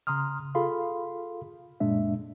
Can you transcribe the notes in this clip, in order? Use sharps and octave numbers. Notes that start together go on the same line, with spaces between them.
C#3 A#5 C6 D#6 F6
F4 G#4 A4 F5 B5 C6
F#2 A#2 G#3 D4 E5